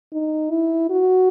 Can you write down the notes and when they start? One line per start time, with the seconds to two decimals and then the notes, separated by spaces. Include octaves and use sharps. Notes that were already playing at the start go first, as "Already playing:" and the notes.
0.13 D#4
0.51 E4
0.90 F#4